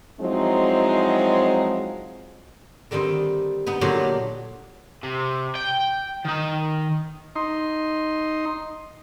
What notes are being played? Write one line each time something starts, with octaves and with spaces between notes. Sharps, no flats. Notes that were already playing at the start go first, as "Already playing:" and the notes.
F3 F#3 G#3 C4 D#4 E4
D3 D#3 G3 C4 D#4
B3 D#4
A#2 D3 F#3 G4 C#5
C3
G5
D#3 D#4
D#4 C6